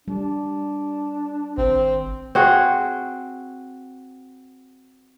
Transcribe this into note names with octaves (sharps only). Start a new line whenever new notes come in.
G3 D4
G#1 C4
C4 F#4 G#4